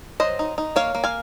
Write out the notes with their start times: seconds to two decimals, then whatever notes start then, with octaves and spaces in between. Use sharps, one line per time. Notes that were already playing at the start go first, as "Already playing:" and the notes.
0.20 F#3 C5 D#5
0.39 D#4
0.58 D#4
0.76 A#3 C#5 F5
0.95 A#3
1.04 F5 G#5